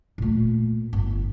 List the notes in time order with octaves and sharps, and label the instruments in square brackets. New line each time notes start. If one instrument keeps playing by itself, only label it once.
[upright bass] A#2 A3
G1